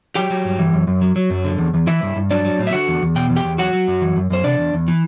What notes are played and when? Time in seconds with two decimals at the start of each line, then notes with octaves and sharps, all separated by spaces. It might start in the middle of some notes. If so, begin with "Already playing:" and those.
0.15 F#3 G4 G5
0.30 F#3
0.45 G2
0.59 E3
0.73 F#2
0.87 F#2
1.01 F#3
1.16 F#3
1.30 F#2
1.45 D3
1.58 E2
1.74 E2
1.87 E3 E4 E5
2.02 G2
2.16 G2
2.31 F#3 D4 D5
2.45 F#3
2.59 A2
2.67 E5
2.73 D3 F#4 F#5
2.88 E2
3.02 E2
3.15 B2 G5
3.30 E2
3.36 G4 G5
3.44 E2
3.58 F#3 F#4 F#5
3.73 F#3
3.87 F#2
4.02 E3
4.16 F#2
4.30 F#2 C5
4.44 C3 D4 D5
4.58 E2
4.73 E2
4.88 E3